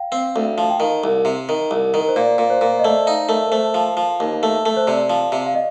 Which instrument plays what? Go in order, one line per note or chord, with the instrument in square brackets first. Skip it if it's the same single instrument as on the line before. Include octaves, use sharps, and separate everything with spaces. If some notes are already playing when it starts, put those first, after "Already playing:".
Already playing: [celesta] F5 G5
[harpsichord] C4 [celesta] F5
[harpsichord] D2
F3
[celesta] G5
[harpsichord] D#3 [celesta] F5
[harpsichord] C2
C3
D#3
C2
D#3
[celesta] A#4
C5
[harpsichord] A#2 [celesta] D5
[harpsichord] A#2
[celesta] C5
[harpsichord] A#2
[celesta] D#5
[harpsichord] A3 [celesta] D5
[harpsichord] D#4 [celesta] F5
[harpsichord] A3 [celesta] A#4
[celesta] A#4
[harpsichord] A3 [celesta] C5
[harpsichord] F3
F3
D#2
A3
A3
[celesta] C5
[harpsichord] C3 [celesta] D5
[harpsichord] F3
C3
[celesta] F5
D#5